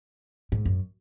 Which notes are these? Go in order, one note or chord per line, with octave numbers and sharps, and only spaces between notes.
G#2
F#2